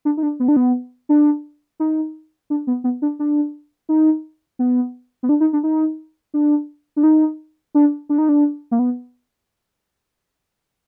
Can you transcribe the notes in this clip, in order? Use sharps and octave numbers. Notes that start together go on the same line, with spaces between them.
D4
D#4
D4
B3
D4
B3
D4
D#4
D4
B3
B3
D4
D4
D#4
B3
B3
D4
D#4
D4
D#4
D4
D4
D#4
D4
D4
D#4
D4
A#3
B3